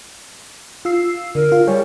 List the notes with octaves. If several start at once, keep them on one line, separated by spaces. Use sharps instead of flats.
F4 E6 C7
D3 A#4
F4
G3 G4 G#4 C#5